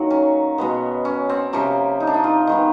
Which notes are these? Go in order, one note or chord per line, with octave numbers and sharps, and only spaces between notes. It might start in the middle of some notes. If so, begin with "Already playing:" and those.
Already playing: D#3 F#3 A#3 F#4
C#4
B2 G#3 B3
C#4
C4
C3 F3 A#3 C#4
D#4
D4
D#4
F4
D#3 G#3 B3